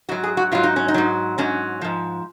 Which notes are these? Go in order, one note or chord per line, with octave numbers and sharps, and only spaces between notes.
G#2 F#3 F#4
G#4
F#4
G#2 F#3 F4
D#4
C#4
D#4
G#2 F#3
G#2 F#3 C#4
G#2 F3